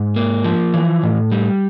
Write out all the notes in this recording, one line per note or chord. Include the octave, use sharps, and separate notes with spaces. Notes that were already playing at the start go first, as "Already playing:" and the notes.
Already playing: G#2
A#3
F3
E3
A2
G3